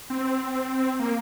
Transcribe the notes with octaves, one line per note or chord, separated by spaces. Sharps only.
C4
A#3